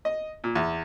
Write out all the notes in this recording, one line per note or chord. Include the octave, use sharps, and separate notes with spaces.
D#5
A#2
E2